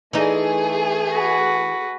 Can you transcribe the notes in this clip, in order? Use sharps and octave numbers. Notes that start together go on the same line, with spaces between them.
E3 A3 D#4 G#4
F#4 B4